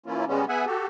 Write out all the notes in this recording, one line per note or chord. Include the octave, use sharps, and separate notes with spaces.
E3 A#3 C#4 E4 F4
C#3 G3 G#3 B3 C#4
B3 G#4 E5 F#5 G#5
F#4 G4 A4